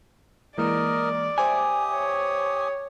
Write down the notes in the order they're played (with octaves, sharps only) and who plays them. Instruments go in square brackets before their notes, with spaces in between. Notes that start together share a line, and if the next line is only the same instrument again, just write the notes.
[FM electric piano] E3 G#3 A#3 [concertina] A#4 D#5 [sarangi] D5
[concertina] G4 D#6 [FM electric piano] C5 E5 [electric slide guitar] G#5
[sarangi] C#5